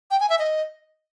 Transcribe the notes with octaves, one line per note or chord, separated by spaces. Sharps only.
G5
G#5
E5
D#5